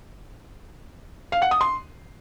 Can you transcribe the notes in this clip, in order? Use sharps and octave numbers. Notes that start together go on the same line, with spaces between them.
F5
F#5
D#6
C6